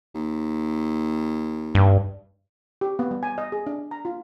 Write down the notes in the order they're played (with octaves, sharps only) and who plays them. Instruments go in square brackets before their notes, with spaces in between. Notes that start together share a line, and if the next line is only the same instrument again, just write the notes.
[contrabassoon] D#2
[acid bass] G2
[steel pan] G4
B3
G3
G#5
D#5
G#4
D4
A#5
F4